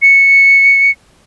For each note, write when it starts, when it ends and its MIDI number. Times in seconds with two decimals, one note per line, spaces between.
0.02 0.91 97